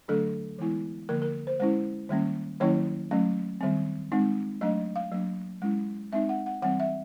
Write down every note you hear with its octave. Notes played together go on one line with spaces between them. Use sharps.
D3 F#3 A3 D4 A4
E3 G#3 B3 E4
D3 F3 A#3 A#4
A#4
C5
G#3 C#4 E4 C5
D#3 G3 A#3 C#4
D#3 F#3 A#3 C#4 E4 C#5
F#3 A3 C#4
D#3 G3 C4
G#3 C4 D#4
F#3 A3 D4 D#5
F5
F#3 A#3 D4
G#3 C#4 E4
G#3 C4 D#4 E5
F#5
F#5
E3 G3 C4 F#5
E5